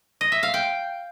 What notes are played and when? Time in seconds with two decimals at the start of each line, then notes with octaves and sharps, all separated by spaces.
0.21 D#5
0.32 E5
0.43 F5
0.54 G5